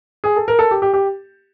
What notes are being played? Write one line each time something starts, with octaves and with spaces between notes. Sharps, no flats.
G#4
A4
A#4
A4
G4
G4
G4